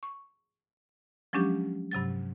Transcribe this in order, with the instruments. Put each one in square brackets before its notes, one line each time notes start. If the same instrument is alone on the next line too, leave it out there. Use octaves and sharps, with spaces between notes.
[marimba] C#6
F3 F#3 G#3 C#4 D4 G4
G2 C3 F#3 A6